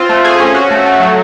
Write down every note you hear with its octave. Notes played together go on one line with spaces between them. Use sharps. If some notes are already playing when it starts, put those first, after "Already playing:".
Already playing: C4 F4
A3
G#4
C#4
F#4
A3
A3
F#3